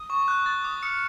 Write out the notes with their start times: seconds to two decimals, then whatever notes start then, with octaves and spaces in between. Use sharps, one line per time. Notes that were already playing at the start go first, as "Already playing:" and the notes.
Already playing: D#6
0.10 C#6
0.28 F#6
0.46 A6
0.64 D6
0.83 F6 C#7